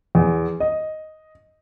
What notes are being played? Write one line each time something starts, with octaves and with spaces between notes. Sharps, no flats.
E2
D#5